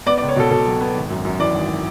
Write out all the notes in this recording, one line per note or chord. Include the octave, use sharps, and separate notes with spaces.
B3 D5
D5
C#2
C#5
B2 A4
B2 A4
F#3
B3
G#1
F#2
F#2
E3 D5
G#1